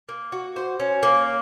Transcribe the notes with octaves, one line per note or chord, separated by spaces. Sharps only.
A#3
F#4
C5
C#4
A#3